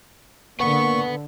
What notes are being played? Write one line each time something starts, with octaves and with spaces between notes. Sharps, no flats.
D3 A#3 B4 F#5 C#6